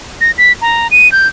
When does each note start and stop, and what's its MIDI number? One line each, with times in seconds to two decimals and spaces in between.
0.21 0.31 94
0.38 0.53 95
0.62 0.88 82
0.91 1.11 99
1.12 1.27 91